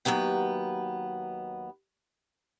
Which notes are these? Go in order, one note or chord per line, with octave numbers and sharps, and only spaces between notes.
D#2 G#2 F#3 B3 G5